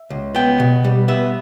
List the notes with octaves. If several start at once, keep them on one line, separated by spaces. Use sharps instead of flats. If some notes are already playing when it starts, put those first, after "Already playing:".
Already playing: E5
C#2
B3 G5
B2
G3
B3 E5